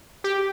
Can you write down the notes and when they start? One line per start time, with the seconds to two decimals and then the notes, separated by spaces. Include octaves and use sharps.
0.24 G4